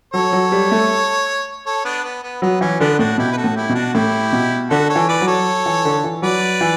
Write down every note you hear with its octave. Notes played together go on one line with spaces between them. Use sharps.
F#3 A4 C#5
F#3
G3
A3
A4 C#5
B3 D4
B3
B3
F#3 B3
E3 C#4
D3 B3 D4
A2 D4 F#4
B2 E4 G4
B4
F#4 A4
A2
E4 G4
B2
D4 F#4
A2 E4 G4
B2
D3 F#4 A4
A4 C#5
E3
B4 D5
F#3
A4 C#5
E3
D3
E3
F#3 B4 D5
E3